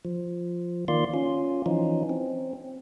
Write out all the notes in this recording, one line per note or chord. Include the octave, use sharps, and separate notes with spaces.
F3
D#3 A#3 F4 D5 C6
C#4 F4
E3 F3 C#4 D#4
C4